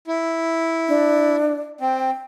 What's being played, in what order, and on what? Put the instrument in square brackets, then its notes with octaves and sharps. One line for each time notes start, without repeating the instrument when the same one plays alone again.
[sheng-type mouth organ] E4
[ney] D4
[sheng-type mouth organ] C4 [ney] G5